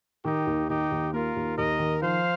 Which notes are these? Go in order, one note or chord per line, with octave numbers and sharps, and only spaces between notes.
D#3 D#4 G4
D#2
D#3 D#4 G4
D#2
A#3 F4 A#4
D#2
D#2 A#4 D#5
D#3
F3 C5 F5